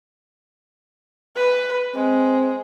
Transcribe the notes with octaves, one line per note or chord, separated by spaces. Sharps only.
B4
G#3 C4